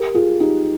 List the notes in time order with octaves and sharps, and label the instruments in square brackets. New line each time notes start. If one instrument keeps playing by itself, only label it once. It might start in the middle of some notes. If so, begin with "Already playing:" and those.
Already playing: [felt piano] G4 A#4
F4 G#4
D#4 G4